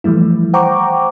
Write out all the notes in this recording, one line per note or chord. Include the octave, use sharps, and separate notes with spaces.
E3 F3 G3 A3 E4
C5 F#5 G5 A#5 C#6 D6